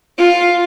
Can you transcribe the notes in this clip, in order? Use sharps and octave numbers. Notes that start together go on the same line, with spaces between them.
F4